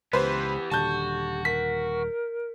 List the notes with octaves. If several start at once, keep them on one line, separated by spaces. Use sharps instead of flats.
C#2 E3 B3 G4 B4 C5
D#1 D3 F#4 A5 G6
A#4 B6